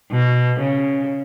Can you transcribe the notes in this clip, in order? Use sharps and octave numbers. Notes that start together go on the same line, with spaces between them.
B2
C#3